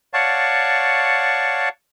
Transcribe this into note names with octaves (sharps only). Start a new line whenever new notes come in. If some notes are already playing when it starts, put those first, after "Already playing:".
C#5 D5 F5 F#5 A5 C#6